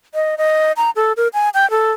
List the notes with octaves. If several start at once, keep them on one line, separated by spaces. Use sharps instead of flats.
D#5
D#5
A#5
A4
A#4
G#5
G5
A4